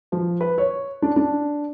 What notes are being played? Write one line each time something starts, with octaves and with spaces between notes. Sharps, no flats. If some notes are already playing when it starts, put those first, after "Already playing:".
F3
B4
C#5
D4
D4